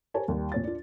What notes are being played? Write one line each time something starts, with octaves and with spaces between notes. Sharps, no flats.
G4 A#4 C5 C#5 G#5 A5
D#2 G3
A#2 C#5 A6
D4 F4